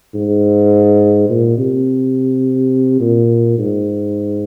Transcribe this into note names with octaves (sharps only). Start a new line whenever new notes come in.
G#2
A#2
C3
A#2
G#2